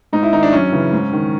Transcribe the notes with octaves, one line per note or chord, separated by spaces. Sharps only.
G#2 D#4
E4
D#3 D#4
D4
F#2 C#4
C#3 E3
G#2
D#3